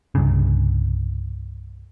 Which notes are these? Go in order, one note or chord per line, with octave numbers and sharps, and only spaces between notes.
C2 G2 C#3